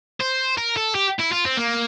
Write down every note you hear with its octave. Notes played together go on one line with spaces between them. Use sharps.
C5
A#4
A4
G4
E4
F4
C4
A#3